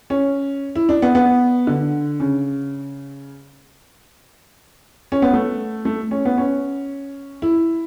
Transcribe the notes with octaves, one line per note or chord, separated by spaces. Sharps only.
C#4
E4
D4
B3
B3
D3
C#3
C#4
B3
A3
A3
C#4
B3
C#4
E4